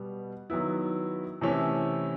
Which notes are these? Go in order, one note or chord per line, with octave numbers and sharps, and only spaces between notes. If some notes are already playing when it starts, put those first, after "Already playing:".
Already playing: B2 G3 B3
D#3 F#3 B3 E4
C3 E3 A3 C#4 E4